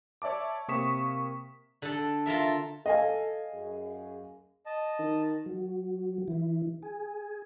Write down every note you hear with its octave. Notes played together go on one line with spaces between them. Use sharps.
C#5 D5 E5 A5 D6
C3 A#3 C#6 D#6 B6 E7
D3 A4
F4 A4 A#4 E5
A4 D#5 F5 G#5
F#2 G#4
D#5 A5
D#3
F#3
E3
G#4